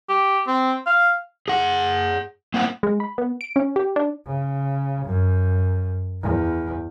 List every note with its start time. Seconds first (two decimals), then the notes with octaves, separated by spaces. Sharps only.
0.09 G4
0.47 C4
0.86 F5
1.48 G#4 F#5
2.54 A#3 C4 E4 F#5
2.83 G#3
3.00 B5
3.18 B3
3.41 D7
3.56 C#4
3.76 G4
3.96 D4
4.26 C#3
5.05 F#2
6.22 E2